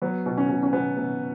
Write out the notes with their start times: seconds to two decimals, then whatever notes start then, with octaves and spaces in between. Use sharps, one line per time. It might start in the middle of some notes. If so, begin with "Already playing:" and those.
0.02 F#3 B3
0.26 B2
0.37 C#4
0.49 B2
0.63 C#4
0.73 B2 B3
0.97 B2